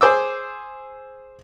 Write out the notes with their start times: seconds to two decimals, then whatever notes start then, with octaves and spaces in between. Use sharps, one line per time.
0.01 G#4 C5 D6 E6